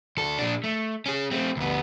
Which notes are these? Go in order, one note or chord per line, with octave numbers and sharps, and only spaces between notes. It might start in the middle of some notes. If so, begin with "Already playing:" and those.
D2 A4
A#2 D4
A3
C#4 G#4
A3 C4
D2 B3